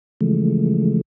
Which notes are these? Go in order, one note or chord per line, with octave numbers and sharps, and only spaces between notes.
C#3 E3 F3 G#3 A3